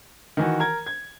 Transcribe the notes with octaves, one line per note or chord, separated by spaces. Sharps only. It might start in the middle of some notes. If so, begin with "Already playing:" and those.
D#3 E3 F#4
A#4 A#5 G#6
G#6